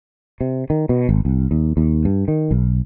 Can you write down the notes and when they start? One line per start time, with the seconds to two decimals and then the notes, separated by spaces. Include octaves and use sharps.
0.41 C3
0.70 D#3
0.89 B2
1.09 G#1
1.25 C2
1.51 D#2
1.77 D#2
2.05 G2
2.28 D#3
2.51 B1